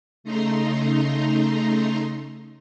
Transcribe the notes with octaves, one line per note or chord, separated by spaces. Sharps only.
C#3 A3 D#4 A#5 C6